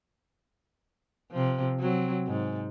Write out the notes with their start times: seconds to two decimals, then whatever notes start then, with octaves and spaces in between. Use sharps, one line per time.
1.31 C3 F3
1.80 F#3 C4
2.26 G#2